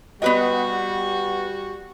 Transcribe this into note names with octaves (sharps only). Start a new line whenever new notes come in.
G3 B3 F#4 B4 D#5